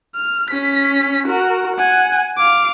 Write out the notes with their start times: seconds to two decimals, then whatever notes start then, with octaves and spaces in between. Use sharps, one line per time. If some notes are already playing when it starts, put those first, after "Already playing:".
0.15 F6
0.50 C#4 B6
1.27 F#4 A#4
1.76 F#5 G#5
2.38 F5 D6